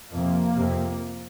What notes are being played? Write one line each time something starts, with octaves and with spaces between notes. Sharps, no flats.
F2 C3 A#3
F2 C3